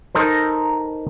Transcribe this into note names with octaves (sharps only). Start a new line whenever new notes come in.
D#4 A4 A#4 C5